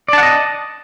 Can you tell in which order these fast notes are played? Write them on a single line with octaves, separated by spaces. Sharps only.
D5 A5 F#5 D#5